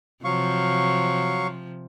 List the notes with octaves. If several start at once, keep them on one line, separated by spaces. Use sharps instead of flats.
C3 F3 F#3 F5 C#6